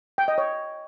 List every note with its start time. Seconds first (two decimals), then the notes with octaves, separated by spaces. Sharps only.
0.18 G5
0.28 D#5
0.38 C#5